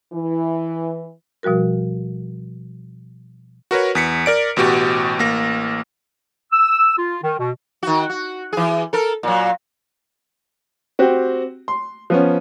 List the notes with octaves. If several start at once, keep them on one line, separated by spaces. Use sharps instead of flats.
E3
B2 F3 G3 F#4 A#4
F#4 A#4 B4 C#5
E2 B6 C#7
A#4 D5 D7
A1 B2 F#4 G4
A1 A#3 A#6
E6
F4
D#3
B2
D#3 F#4
F#4
E3 G#4
A4 A#4
A#2 F#3
C4 F#4 G4
C6
F3 B3 C#4